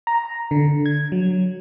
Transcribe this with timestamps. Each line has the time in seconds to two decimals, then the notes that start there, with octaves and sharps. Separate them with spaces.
0.07 A#5
0.51 D3
0.86 G#6
1.12 F#3